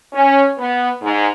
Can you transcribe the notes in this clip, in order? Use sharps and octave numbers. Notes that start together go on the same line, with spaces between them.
C#4
B3
G#2